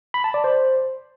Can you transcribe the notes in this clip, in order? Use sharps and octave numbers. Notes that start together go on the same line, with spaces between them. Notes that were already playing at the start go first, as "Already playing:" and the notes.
B5
A5
D5
C5